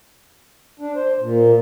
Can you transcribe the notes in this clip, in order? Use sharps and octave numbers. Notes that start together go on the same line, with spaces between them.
D4
C5
A#2